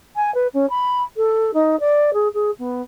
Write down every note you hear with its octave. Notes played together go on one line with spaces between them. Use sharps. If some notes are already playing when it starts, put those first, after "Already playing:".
G#5
B4
C#4
B5
A4
D#4
D5
G#4
G#4
B3